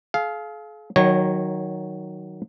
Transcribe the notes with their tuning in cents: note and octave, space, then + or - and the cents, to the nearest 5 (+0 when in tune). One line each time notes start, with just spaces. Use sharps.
G#4 +45 F5 +0
D#3 +0 F#3 +10 C#5 -15